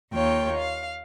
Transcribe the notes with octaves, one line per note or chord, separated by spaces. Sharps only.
D#2 F4 C#5 G5
F5